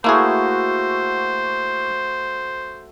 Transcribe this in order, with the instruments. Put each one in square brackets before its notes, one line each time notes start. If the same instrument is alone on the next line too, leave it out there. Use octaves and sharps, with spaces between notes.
[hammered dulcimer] A3 F#4 [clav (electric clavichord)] A#3 E4 G#4 [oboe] C5